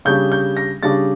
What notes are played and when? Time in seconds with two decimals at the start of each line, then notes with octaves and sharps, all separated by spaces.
0.05 C#3 G3 D4 G6
0.32 G6
0.57 A#6
0.83 C#3 G3 D4 A6